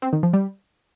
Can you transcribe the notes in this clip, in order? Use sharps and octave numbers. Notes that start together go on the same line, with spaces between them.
C4
D#3
F3
G3